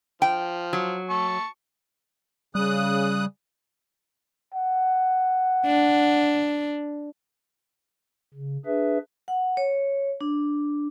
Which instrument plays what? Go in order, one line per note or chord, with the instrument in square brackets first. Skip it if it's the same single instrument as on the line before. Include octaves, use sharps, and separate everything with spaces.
[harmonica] F3 [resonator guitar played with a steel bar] G5
[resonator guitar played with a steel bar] F#3
[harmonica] A5 C#6
[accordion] C#3 D#6 F#6 [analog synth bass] G3
[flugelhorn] F#5
[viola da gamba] D4
[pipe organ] C#3
D4 G#4 B4 E5
[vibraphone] F#5
C#5
D4